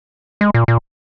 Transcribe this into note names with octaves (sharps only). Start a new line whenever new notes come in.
G#3
A#2
A#2